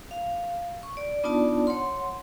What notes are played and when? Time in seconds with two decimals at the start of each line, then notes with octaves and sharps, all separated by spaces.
0.11 F5
0.83 C#6
0.97 D5
1.24 B3 D4 D#4 F4 D5 A5
1.67 C#5 F#5 C6